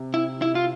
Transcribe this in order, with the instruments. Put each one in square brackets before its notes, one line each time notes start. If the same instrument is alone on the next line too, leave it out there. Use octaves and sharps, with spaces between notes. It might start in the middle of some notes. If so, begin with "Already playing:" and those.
Already playing: [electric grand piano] C3
[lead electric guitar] E4
E4
F4